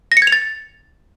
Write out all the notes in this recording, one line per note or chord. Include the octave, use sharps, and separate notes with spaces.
A#6
C#7
G#6
F7
A6